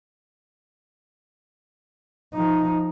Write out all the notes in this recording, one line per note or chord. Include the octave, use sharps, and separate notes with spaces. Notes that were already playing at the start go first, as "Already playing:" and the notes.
F3 D#4